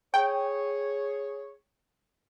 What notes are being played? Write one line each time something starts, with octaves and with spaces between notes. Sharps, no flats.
G#4 C#5 G5